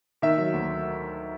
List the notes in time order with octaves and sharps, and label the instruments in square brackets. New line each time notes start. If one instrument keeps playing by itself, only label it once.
[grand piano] D#3 E5
F#3
D2